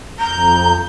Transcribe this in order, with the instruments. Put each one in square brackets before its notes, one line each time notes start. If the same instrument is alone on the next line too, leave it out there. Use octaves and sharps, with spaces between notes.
[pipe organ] F2 G6 [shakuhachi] A#5